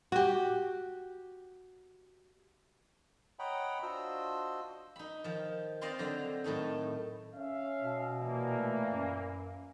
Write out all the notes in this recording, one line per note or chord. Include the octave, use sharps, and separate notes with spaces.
F#4 G4
C#5 D#5 F#5 G5 A#5 B5
D4 F4 F#4 C5 D#5 E6
D#4 B5
D#3 F3
C4 F4 C5 D5 D#5 F5
D3 F#3 C5 A#5
A2 D#3 A3 D#4
C#4 E5 F5
B2
A#2 E3 A#3
A3
F#2